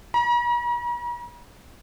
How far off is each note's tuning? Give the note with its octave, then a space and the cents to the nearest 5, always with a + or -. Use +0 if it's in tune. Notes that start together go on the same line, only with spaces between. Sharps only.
A#5 +45